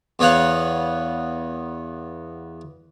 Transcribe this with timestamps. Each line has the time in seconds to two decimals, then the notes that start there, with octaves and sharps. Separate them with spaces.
0.19 E2 B3 C#5 F5 F#5